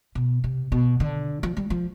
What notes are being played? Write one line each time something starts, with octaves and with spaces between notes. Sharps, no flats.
B2
C3
B2
D3
F3
G3
F3